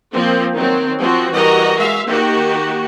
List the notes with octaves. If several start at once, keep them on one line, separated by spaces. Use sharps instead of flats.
F3 A#3 C4
D#3 F#3 C4
F3 C4 F#4
E3 G3 F#4 A#4 D#5 A#5
G#3 E5 F5
D#3 A#3 F#4 G4